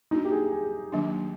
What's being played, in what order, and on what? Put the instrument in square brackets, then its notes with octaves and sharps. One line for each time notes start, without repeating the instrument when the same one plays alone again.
[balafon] A#3 D4 F#4 [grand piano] D#4
[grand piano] G4
G#4
G#4
[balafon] D#3 F#3 A#3 D4